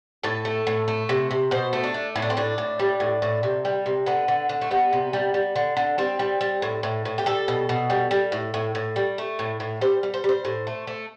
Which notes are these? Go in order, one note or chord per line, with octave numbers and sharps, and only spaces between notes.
A2 A4
A3
A2
A3
C3
C3
B2 C5
A3
D4
A3
A2 E4
D4
C4
A2 D4
A2
G3
A2
A2
C3
G3
C3
D3 B3
D3
D3
A3
G3 B3
C3
G3
G3
D3
D3
G3 C4
G3
G3
A2
A2
A2
G4
G3 A4
B2
B2
G3
G3
A2
A2
A2
G3
A3
A2
A2
G3 C5
G3
C5
G3 C5
A2
A3
A3